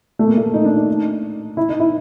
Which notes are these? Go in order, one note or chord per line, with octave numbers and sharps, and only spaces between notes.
A3
A#3
A3
D#4
D4
D#4
E4
D#4
E4